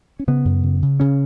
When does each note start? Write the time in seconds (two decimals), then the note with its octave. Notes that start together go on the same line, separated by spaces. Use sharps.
0.19 C#4
0.27 C#3 B3
0.45 F#2
0.63 C#3
0.82 C#3
1.00 C#3 C#4